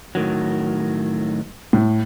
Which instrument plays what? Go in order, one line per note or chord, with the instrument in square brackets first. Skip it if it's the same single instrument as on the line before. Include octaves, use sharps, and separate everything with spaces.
[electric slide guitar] A2 D#3 F#3
[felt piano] A2